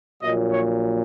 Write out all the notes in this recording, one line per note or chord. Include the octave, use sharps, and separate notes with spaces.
A#1 A#2 F#3 D#5
C#5